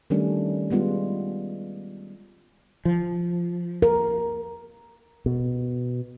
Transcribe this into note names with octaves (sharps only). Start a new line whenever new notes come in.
D#3 G3 A3 C#4 D4
G3 G#3 B3 F4
F3
A#4
B2